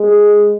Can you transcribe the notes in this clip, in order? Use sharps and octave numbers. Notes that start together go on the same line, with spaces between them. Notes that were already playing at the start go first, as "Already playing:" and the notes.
Already playing: G#3